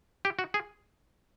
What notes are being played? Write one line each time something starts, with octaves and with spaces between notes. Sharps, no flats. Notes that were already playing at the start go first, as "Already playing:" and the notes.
G4
F#4
G#4